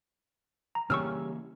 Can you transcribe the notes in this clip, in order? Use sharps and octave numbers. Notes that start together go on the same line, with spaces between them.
A#5
C#3 E3 G3 A#3 C#4 C#6 E6 F6